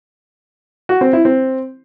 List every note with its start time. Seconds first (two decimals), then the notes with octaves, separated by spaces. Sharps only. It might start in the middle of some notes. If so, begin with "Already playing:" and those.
0.89 F#4
1.01 C4
1.13 E4
1.25 C4